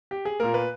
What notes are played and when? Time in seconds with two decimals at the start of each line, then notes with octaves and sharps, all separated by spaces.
0.11 G4
0.25 G#4
0.40 A#2 A#3 A#4
0.54 B4